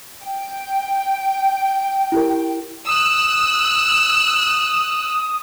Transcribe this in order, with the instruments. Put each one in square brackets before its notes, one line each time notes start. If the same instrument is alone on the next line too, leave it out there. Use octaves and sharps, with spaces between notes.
[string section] G5
[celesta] E4 G4 A#4
[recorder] D#6 [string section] E6 F#6